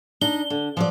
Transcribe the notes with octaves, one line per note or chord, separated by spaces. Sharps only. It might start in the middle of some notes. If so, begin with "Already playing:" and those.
D4 D#4 G7
D3
F3 F#3 D5